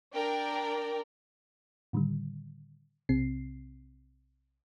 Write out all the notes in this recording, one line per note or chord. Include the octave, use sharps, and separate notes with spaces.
D4 A#4 D5 G5
A2 D3 D#3 G3
B1 C3 C4 C7